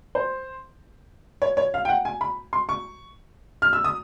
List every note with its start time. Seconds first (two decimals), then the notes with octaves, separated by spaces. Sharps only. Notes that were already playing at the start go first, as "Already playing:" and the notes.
0.15 C5
1.42 C#5
1.57 C#5
1.74 F5
1.85 G5
1.89 F#5
2.05 G#5
2.21 B5
2.53 C6
2.69 C#6
3.62 F6
3.73 E6
3.84 D#6